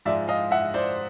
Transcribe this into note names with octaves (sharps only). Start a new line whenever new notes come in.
G#2 F3 G#3 D5 E5
D#5 F5
E5 F#5
C5 D5